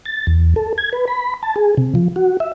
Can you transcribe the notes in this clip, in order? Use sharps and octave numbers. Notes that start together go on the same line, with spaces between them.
A6
E2
A4
G#6
B4
B5
A5
G#4
C3
F3
F#4
E5